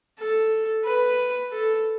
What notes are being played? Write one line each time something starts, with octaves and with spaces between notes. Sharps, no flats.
A4
B4
A4